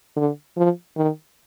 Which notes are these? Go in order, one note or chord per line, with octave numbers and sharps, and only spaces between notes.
D3
F3
D#3